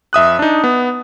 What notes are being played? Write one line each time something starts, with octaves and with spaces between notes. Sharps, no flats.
F2 E5 D#6 F#6
D4 D#4
B3